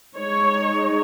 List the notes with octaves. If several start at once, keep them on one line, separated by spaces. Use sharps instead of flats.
G#3 D#4 C#5